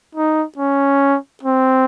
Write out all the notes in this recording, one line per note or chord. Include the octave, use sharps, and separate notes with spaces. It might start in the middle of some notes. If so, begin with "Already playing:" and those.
D#4
C#4
C4